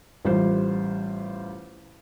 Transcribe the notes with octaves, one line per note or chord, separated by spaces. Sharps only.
A1 G3 F4 C5